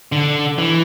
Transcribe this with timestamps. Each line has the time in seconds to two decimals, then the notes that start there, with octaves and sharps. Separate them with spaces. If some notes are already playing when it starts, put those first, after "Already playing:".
0.12 D3
0.58 E3